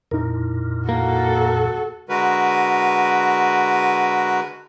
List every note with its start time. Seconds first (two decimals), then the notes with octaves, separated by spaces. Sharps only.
0.11 F2 A#2 D#4 E4 A#4
0.89 A#3 F#4 A4
2.09 D3 G#3 F#4 A#4 B4